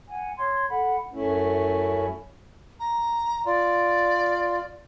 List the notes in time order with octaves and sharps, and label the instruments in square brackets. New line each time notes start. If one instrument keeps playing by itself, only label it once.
[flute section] F#5 G#5
C#5 C6 G#6
A4 F#5 B5
[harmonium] F#2 A3 C#4 E4
[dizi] A#5
[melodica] F4 [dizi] D5